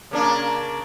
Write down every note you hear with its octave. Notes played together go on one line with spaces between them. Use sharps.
C#3 A#3 D4